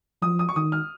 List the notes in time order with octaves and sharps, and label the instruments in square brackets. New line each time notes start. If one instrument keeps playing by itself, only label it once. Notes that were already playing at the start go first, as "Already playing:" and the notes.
[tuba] F3 [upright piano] D#6
[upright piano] D#6
C#6
[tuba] D#3 [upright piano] D#6
[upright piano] F6